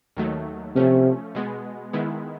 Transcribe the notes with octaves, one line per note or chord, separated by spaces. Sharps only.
D#2 D#3 F#3 A3
C3 F3 A3 C#4
B2 G#3 B3
D#3 G#3 B3 E4